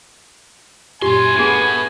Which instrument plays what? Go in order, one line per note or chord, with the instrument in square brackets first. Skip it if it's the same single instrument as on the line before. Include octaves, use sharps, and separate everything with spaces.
[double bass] F#2 A#2 [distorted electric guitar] E4 C6 [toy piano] G4 [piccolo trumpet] G#5
[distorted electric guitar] A2 [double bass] B3 [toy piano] D4 G#4